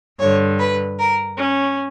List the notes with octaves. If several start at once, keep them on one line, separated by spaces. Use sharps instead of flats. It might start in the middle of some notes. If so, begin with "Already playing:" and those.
G2 D3 C#5
B4
A#4
C#4